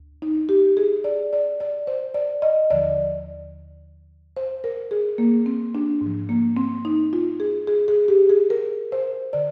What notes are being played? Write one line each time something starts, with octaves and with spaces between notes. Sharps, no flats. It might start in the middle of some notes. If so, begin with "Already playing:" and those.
Already playing: D2
D#4
G4
G#4
D5
D5
D5
C5
D5
D#5
D#2 D3 F3 D5
C5
A#4
G#4
A#3
C4
D4
G#2
F3
A#3
C4
D#4
F4
G#4
G#4
G#4
G4
G#4
A#4
C5
D3 D5